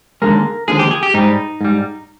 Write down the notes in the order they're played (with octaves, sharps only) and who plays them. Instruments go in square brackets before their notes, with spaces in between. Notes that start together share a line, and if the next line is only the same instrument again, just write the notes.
[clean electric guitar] D#2 D3 F3 G#3 A#4
D#2 D3 F3 G#3 G#4
G4
G#4
G4
G#2 G3 D#4
G#2 G3